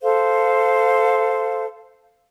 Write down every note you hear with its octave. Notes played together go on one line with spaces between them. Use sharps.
A4 C5 F5